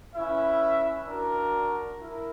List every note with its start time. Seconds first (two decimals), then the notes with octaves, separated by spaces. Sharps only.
0.13 C#4 E4 B4 E5
1.07 D4 F#4 A#4
2.01 E4 A#4